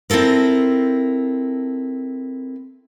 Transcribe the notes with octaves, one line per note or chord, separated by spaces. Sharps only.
C4 E4 F4 A4 A#4